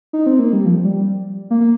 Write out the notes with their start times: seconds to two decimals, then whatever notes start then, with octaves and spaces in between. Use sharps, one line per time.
0.13 D#4
0.26 C4
0.39 A#3
0.53 G3
0.66 F3
0.85 G3
1.51 A#3
1.61 A#3